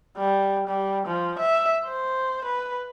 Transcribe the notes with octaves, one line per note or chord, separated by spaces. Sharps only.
G3
G3
F3
E5
C5
B4